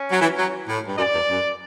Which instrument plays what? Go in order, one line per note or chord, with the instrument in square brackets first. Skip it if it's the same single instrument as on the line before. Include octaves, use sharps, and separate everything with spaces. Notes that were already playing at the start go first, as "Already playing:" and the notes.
Already playing: [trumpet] C#4
[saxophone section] F#3
E3
F#3
A2
G2
[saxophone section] F#2 [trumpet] D5
[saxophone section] E2
F#2